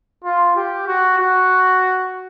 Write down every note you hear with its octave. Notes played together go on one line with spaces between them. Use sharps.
F4
G4
F#4
F#4